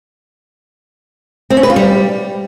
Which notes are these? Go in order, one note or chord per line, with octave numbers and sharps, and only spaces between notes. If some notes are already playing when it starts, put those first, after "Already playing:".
C4
C#4
B4
F4
G3